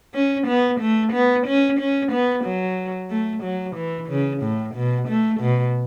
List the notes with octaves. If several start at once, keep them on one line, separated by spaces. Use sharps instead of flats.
C#4
B3
A3
B3
C#4
C#4
B3
F#3
A3
F#3
E3
C#3
A2
B2
A3
B2